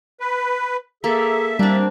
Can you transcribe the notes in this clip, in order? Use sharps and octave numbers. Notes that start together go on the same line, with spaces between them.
B4
A#3 G#4 A4 E5 A#5
G3 A#3 C4 D4